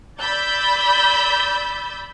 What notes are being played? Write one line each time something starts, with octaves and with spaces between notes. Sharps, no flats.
D5 B5 E6 G6 A6